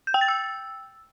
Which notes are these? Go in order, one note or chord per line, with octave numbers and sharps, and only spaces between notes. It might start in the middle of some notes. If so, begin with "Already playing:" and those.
G6
G5
A6
E6